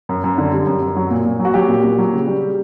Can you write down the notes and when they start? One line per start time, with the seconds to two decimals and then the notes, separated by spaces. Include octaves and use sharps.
0.09 F#2
0.24 F#2
0.38 D3
0.52 G3
0.67 F#2
0.82 F#2
0.96 F#3
1.10 A#2
1.25 A#2
1.39 F#3
1.45 F#4
1.54 F#3 G4
1.68 A#2
1.83 A#2
1.98 F#3
2.13 C#3
2.26 G3